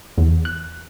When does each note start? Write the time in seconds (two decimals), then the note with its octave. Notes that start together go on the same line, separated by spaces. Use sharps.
0.18 E2
0.45 F#6